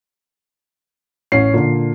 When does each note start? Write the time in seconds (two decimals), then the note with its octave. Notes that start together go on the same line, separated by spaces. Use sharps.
1.32 A1 C#4 C7
1.54 A#2 D3